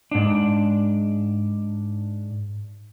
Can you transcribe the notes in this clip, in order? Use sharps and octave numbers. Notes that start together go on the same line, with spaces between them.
G#2 D4